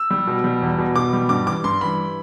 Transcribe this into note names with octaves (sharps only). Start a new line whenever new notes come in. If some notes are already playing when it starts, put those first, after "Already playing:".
Already playing: E6
G3
B2
G3
E2
B2
B2 D6
G3
G2 D6
E3 D6
G2 C6
E3 B5